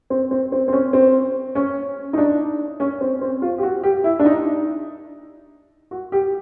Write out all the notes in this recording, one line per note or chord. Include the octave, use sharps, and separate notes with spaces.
C4
C4
C4
C4
C#4
C4
C#4
D#4
D4
C#4
C4
C4
F4
G4
F#4
G4
E4
D4
D#4
F#4
G4